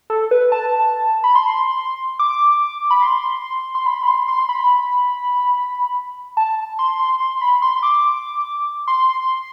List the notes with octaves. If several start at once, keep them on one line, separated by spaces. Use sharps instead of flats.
A4
B4
A5
B5
C6
D6
B5
C6
C6
B5
B5
C6
C6
B5
A5
C6
C6
C6
B5
C6
D6
C6